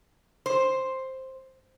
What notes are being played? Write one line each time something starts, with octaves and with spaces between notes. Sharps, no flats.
C5